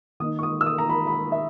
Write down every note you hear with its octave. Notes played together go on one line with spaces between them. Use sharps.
D#3 A#3 D#4 D#6
C#6
D#6
E6
D#6
A#5
B5
B5
E5